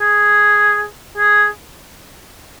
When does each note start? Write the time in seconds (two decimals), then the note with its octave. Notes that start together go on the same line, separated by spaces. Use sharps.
0.01 G#4
1.18 G#4